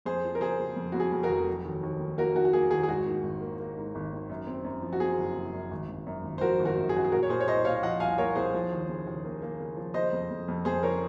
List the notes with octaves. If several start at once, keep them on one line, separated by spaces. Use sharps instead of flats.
F2 G#4 C5
F3
A#4
C#3 G#4 C5
C#3
F2
F2 F#4
G#4
F2
F#4 A#4
F1
F#3
D#2
D#2
D#3
A#3 F#4 A#4
D#3 F#4
F#4
A#3 G#4
D#2 G#4
G#4
G#2 F#4
D#3
G#1
A#3
A#3
G#2
G#1
D#3
F#2
C4
F#2
F3
F#4
C4 G#4
F#1
F#1
F#2
G#1
G#1
F#2
G#1
C5
F3 F#4 A#4
G#1
F#4 A#4
F#2
G#4
F#2 F#4
G#4
A#2 F#4 A#4
C#5
A#2 G#4 C5
C#5
C2 C5 D#5
A#2 C#5 F5
F3 D#5 F#5
C2 F5 G#5
A#3 A#4 C#5
C2 G#4 C5
F3
D#2
C#3
D#2
A#3
A#3
C#3
F3
C#3 C5 D#5
F2
F2
F2
F2 G#4 C5
C#3 A#4 C#5